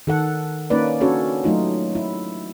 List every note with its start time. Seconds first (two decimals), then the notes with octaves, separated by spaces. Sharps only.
0.07 D#3 A4 F#5
0.70 A#3 C#4 D#4 B4 D5
1.01 C#4 D4 F#4 A4 C#5
1.44 F#3 A3 D#4 F4
1.95 E4